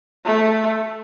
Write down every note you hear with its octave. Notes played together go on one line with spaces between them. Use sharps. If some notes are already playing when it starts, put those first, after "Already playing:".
A3